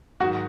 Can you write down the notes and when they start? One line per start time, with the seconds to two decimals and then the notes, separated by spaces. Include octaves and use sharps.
0.20 G#2 D#3 F#3 F#4